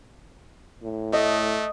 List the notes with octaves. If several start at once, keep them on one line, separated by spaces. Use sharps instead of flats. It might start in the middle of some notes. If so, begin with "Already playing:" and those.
A2
A3 D#5